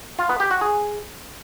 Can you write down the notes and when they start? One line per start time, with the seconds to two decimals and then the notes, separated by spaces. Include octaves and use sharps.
0.19 F4
0.29 B3
0.40 G4
0.51 F#4
0.61 G#4